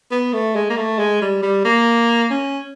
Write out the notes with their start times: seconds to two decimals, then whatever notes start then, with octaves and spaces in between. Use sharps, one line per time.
0.11 B3
0.33 A3
0.55 G#3
0.70 A#3
0.77 A3
0.99 G#3
1.21 G3
1.42 G3
1.65 A#3
2.30 C#4